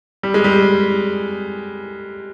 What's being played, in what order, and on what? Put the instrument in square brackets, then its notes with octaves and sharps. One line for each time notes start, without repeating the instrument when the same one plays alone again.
[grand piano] G3
G#3
G3